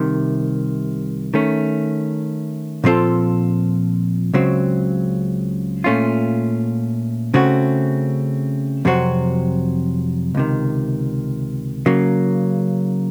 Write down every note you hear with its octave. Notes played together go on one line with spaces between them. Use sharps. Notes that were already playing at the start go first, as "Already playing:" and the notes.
Already playing: C2 C3 D#3
D#3 A3 C#4
A#2 F3 C4 F4 A4
C#2 C#3 F#3 C4
A#2 A3 C#4 F4
C#3 A3 C4 F#4
F2 C3 F#3 C4 F#4
C#2 C3 D#3
C#3 F#3 A#3